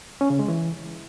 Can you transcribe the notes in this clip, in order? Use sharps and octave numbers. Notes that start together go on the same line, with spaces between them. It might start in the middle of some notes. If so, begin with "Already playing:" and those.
C#4
C#3
G#3
E3